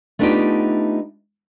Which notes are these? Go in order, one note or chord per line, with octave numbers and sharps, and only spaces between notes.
A3 B3 D4 D#4 F4 G4